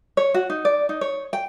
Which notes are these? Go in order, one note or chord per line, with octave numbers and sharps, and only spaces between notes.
C#5
F#4
D#4
D5
D#4
C#5
G5